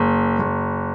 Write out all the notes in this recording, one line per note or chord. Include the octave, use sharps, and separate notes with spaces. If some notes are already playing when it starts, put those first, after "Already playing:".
Already playing: F#1
F#1